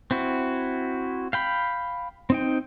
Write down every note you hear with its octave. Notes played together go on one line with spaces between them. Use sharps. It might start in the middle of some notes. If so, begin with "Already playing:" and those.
C4 E4 F#4
F5 G5 B5
C4 D#4 G5